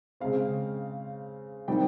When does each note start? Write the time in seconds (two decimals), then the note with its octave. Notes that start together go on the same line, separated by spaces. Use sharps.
0.20 C#3 G#3 C4 F5
1.68 D#3 G3 C4 D#4 G5